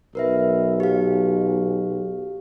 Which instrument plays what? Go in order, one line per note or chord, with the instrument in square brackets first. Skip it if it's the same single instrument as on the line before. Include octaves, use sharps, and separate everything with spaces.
[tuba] B1 [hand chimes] A#4 B4 E5
[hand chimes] G4 F5